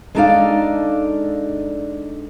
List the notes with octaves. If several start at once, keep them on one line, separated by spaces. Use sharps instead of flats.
G#3 D4 D#4 A4 D5 F5